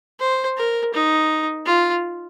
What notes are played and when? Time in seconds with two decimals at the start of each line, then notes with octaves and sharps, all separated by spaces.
0.20 C5
0.57 A#4
0.94 D#4
1.66 F4